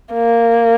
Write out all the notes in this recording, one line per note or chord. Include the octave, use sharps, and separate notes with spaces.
A#3